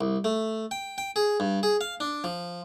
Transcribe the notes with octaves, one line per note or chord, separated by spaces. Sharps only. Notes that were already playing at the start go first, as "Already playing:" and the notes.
C2
A3
G5
G5
G#4
G2
G#4
F5
D4
F3